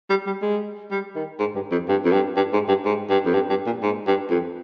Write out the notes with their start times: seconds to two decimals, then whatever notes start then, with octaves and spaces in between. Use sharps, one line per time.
0.10 G3
0.26 G3
0.42 G#3
0.91 G3
1.16 D#3
1.39 G#2
1.55 G2
1.71 F2
1.88 G2
2.05 F2
2.12 G2
2.37 G2
2.53 G#2
2.68 G2
2.85 G#2
3.10 G2
3.26 F2
3.34 G2
3.49 G2
3.66 A#2
3.82 G#2
4.07 G2
4.30 F2